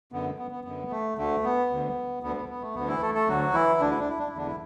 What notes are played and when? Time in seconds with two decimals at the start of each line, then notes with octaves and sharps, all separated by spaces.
0.12 F#2 D3 B3
0.39 B3
0.51 B3
0.64 F#2 D3 B3
0.91 A3
1.18 D2 D3 A3
1.43 B3
1.70 D2 D3
2.23 D2 D3 B3
2.36 B3
2.49 B3
2.62 A3
2.75 D2 D3 B3
2.88 E3 E4
3.01 A3 A4
3.15 A3 A4
3.28 D2 D3 F#3 F#4
3.53 E3 E4
3.80 D2 D3 D4
3.90 E4
3.99 D4
4.09 E4
4.19 D4
4.28 E4
4.33 E2 D3 D4
4.46 E4